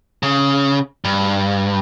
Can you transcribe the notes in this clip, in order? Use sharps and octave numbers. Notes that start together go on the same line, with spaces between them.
C#3
G2